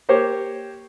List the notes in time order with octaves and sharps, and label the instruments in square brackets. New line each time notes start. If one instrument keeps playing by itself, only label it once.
[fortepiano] A#3 G4 C5 C#5